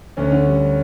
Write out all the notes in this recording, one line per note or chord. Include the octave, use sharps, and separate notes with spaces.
D2 C#4
D3
G3